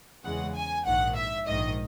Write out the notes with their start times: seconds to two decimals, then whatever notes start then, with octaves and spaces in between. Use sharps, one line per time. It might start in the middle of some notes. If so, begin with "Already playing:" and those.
0.24 E2 C#3 E3 G#3 F#5
0.56 G#5
0.86 A#1 G#2 D#3 F#5
1.16 E5
1.47 A#1 G#2 D#3 D#5